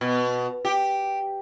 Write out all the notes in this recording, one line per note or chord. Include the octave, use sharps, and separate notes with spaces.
B2
G4